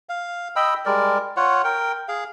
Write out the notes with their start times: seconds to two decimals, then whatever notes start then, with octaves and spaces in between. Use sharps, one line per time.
0.09 F5
0.56 D#5 G5 B5 E6
0.86 G3 G#3 A#4 D5
1.37 F4 C#5 F#5
1.64 A#4 G5
2.08 G#4 F5